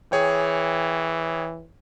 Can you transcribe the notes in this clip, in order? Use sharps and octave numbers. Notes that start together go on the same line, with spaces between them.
E3 G#4 C#5 G5